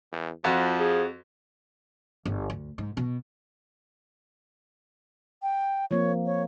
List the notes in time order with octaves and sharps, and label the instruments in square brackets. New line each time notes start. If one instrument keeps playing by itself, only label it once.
[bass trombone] E2
[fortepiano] F2 F#4 [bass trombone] F3
[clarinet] G#4
[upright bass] G1
D2
G#2
B2
[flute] G5
[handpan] F3 A#3 C4 [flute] C#5
[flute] C#5